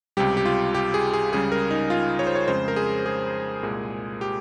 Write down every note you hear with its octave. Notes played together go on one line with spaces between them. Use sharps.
C#2 C3 G3 G4
G4
F4
G4
G#4
G#4
C#2 C#3 G3 G#4
A#4
D#4
F4
C#5
C5
C#5
F2 C#3 G#3 C5
A#4
G#4
G#4
C2 A#2 G#3
G4